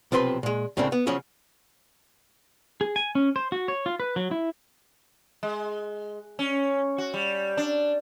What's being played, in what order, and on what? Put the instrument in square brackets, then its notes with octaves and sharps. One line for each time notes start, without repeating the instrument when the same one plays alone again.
[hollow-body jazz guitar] B1 C3 F3 C4 B4 C6
A#2 G#3
D2 A2 C#3 A#3 C4 D4
B3
C#3 F3 F#3 C#4 G#4
[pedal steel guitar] G#4
G#5
C#4
C5
F#4
C#5
F4
B4
F#3
E4
[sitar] G#3
C#4
F#4
G3
D4